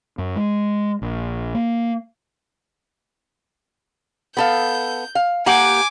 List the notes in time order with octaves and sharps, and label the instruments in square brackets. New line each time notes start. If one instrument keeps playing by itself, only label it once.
[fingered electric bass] F#2
G#3
A#1
A#3
[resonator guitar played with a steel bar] B3 A4 F5 [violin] G6
[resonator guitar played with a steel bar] F5
[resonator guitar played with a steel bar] A#3 G4 F#5 [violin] G#5 D6